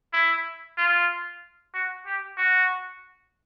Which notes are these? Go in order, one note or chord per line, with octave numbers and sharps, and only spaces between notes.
E4
F4
F#4
G4
F#4